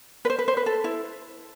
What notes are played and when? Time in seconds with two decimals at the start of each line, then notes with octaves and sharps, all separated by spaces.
0.25 B4
0.30 C5
0.39 B4
0.48 C5
0.57 B4
0.66 A4
0.84 E4